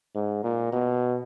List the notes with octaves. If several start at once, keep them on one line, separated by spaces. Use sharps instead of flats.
G#2
A#2
B2